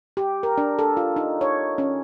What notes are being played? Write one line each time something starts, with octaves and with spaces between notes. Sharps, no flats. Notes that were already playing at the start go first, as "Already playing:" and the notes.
G4
A#4
D4
A4
F4
D#4
C#5
C#4